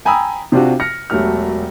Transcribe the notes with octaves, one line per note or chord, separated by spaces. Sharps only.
G5 G#5 A#5 B5 D#6 E6
C3 C4 D4 F4 F#4
F6 A#6 C#7
E1 F#3 A3 G4 F6